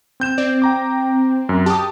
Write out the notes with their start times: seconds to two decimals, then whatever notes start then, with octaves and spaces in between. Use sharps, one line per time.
0.20 C4 G6 E7
0.38 C4 D5
0.62 G5 A#5 D6
1.49 F#2
1.66 G4 A5 D#6